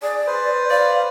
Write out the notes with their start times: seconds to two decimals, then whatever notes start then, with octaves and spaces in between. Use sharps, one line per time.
0.02 G#4 D5
0.27 B4 C5
0.70 D5 F5